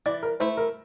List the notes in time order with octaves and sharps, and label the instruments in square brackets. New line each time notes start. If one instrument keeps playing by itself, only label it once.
[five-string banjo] E3 [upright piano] D5
[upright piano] A#4
[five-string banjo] A3 E4 [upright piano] C5
[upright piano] A#4